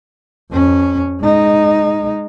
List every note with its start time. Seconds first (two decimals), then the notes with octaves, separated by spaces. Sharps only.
0.52 F2 C#4
1.21 G#3 D#4